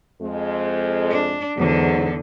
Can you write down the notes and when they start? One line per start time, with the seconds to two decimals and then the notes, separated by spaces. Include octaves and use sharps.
0.21 F2 G#3
1.10 D4
1.57 E2 G#2 D3 F#3